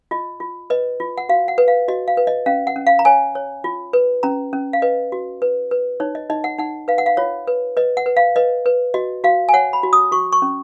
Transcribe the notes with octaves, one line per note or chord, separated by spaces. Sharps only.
F4 D#5
F4
B4 D#5
F4
F#5
F#4 F5
F#5
B4
F5
F#4 D#5
F5
B4
D#5
C#4 F5
F#5
C#4
F5
A#5
C#5 G#5
C#5
F4
B4
C#4 A#5
C#4
F5
B4 D#5
F#4
B4
B4
D#4 C#5
D#5
D#4 D#5
F#5
D#4 F#5
B4 F5
F#5
F5
F4 C#5
B4
B4 D#5
F#5
B4
F5
B4 D#5
B4
F#4 D#5
F#4 F5
G#5
C#5 F#5
B5
F#4
D#6
F#4 C#6
C#6
C#4